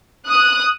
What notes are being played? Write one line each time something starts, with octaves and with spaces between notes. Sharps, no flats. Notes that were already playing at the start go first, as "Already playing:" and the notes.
D#6 F#6